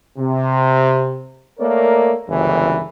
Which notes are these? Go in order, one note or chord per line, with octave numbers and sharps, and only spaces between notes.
C3
A3 A#3 A#4 C#5 D5
G1 C#2 F#2 E3